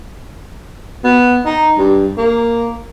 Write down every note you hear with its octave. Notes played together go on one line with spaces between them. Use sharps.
B3
D#4
G2
A#3